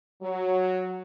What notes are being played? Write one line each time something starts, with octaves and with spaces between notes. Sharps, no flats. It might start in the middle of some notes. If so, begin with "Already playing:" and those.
F#3